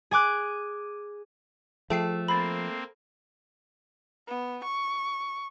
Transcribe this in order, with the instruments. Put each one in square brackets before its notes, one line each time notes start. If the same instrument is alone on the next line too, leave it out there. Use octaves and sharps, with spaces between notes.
[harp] G#4 G#5 D6 F#6
[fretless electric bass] F3 [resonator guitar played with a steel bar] A3 [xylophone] G#4 G5 C7
[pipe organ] A#3 C4 [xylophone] B5 A6
[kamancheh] B3
C#6